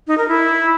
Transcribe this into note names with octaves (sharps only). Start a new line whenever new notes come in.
D#4
A#4
E4